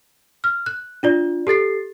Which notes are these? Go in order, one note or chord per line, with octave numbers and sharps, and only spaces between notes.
F6
F#6
D4 F4 D5
G4 A4 A6 C7